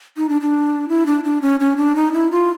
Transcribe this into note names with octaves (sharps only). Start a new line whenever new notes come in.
D#4
D4
D4
E4
D4
D4
C#4
C#4
D4
D#4
E4
F4